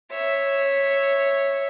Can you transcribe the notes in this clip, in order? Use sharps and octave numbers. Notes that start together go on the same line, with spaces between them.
C#5 E5